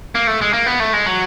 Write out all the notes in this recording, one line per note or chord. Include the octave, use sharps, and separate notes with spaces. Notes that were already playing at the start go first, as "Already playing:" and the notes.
A#3
A3
G#3
A#3
B3
A3
G#3
F#3